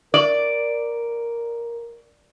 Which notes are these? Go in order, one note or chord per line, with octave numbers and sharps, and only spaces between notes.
A#4 D5